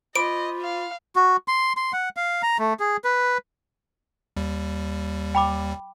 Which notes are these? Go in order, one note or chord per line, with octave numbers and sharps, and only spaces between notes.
F4 C5 D#5 B5 D6 D7
F5
F#4
C6
C6
F#5
F5
A#5
A3
G#4
B4
D#2 G3
G5 B5 D6